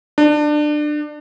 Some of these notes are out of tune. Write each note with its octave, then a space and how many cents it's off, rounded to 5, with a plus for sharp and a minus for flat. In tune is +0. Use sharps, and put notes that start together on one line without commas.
D4 +25